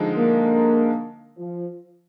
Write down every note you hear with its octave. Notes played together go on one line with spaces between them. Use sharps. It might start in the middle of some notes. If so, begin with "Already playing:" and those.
Already playing: D3 F3 G#3 D#4
A#3
F3